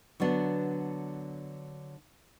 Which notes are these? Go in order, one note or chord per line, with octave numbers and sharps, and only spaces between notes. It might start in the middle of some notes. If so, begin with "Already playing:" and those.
D3 F#3 B3 D4